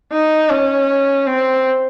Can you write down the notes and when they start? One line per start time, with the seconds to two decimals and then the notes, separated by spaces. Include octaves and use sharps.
0.13 D#4
0.50 C#4
1.27 C4